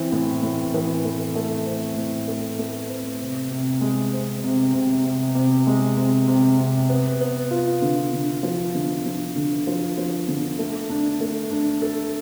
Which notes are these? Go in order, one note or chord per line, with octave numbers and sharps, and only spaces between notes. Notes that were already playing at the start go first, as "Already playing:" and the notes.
Already playing: E3 C4
A2
A2
E3
A3
A3
C4
A2
A3
A3
C4
C3
C3
G#3
C4
C3
C3
C3
C3
G#3
C3
C3
C3
B3
B3
F4
D3
D3
F3
D3
F3
D3
F3
F3
D3
A3
D4
A3
D4
A4